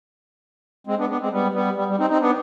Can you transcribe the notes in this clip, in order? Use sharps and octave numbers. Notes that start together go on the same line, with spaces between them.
G#3 C4
B3 D4
B3 D4
G#3 C4
G3 B3
G3 B3
G3
G3
C4 D#4
C4 D#4
B3 D4